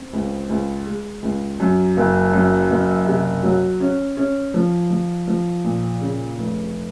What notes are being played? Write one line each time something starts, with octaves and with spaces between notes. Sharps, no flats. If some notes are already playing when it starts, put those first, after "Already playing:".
Already playing: C4
C#2
C#2
G#3
C#2
F#2
F#1
F#2
F#1
C3
F#3
C#4
C#4
F3
F3
F3
A#2
C#3
F1